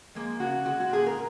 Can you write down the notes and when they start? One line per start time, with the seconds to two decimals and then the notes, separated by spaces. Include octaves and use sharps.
0.15 F3 G#3 A#3
0.40 C#3 F#4
0.66 G#3 F#4
0.80 F#4
0.90 A#2 G#4
1.06 A#4